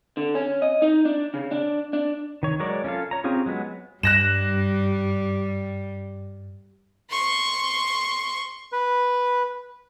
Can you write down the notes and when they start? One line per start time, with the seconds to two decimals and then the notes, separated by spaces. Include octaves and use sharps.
0.17 D3
0.35 C#4
0.62 D#5
0.82 D#4
1.05 D4
1.34 C#3
1.51 D4
1.93 D4
2.43 D#3 C#5
2.60 F#3 G#3 A#4 C#5 D5
2.84 C#4 F4 A4 F5
3.11 C#5 A#5
3.24 C4 C#4 F4 G4 G#4
3.46 F#3 G#3 B3
4.03 G2 G3 F#6 A#6 E7
7.11 C6 C#6
8.72 B4